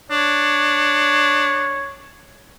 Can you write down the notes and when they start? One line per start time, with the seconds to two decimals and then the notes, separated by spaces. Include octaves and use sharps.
0.11 D4 C#5